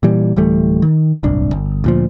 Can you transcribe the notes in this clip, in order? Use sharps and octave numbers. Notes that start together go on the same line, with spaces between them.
A#2 E3 G3
D1 E3 G3 A3
D#3
D1 G1 C2 D4
G1
D2 A#2 F3